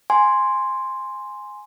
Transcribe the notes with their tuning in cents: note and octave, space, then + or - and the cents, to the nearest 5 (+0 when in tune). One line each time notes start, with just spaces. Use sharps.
G#5 +0 C6 +0